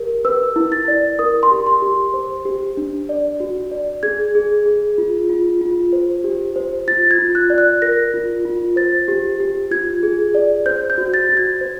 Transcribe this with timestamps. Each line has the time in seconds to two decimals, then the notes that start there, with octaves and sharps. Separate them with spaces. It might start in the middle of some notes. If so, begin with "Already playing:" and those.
Already playing: G4 A#4
0.25 B4 E6
0.56 E4
0.72 A6
0.88 D5
1.19 A#4 D#6
1.43 C6
1.51 G4
1.66 C6
1.82 G4
2.14 C5
2.45 G4
2.77 D4
3.09 D5
3.40 F#4
3.71 D5
4.03 G#4 G#6
4.35 G#4
4.66 G#4
4.98 F4
5.29 F4
5.61 F4
5.93 C5
6.24 G4
6.56 C5
6.88 F4 A6
7.11 G#6
7.19 F4
7.35 F#6
7.50 D5
7.58 F#6
7.82 A#4 A#6
8.14 F4
8.45 F4
8.76 C5 A6
9.08 G4
9.40 G4
9.71 F4 G#6
10.03 G#4
10.35 D5
10.66 C5 G6
10.90 G6
10.98 F#4
11.14 A6
11.29 F#4
11.37 G#6
11.61 C5